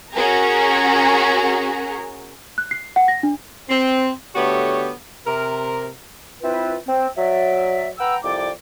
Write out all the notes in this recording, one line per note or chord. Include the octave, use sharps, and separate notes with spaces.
C#4 F#4 G#4 A#4 A#5
F#6
C7
F#5
A#6
D4
C4
D3 A3 B3 F#4 G4 C#5
C3 A#4
C4 E4 F4 B4
C4
F#3 D5 E5
B4 F#5 G5 A#5 E6
C2 F2 D5 G5 D6